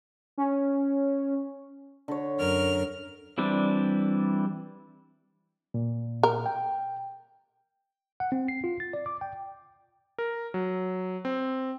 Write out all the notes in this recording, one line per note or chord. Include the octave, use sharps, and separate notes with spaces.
C#4
D3 C#5
F#2 A#4 F6
E3 G3 C4 D4
A#2
A#4
G5
F#5
C4
C7
F4
A6
D5
D6
G5
A#4
F#3
C4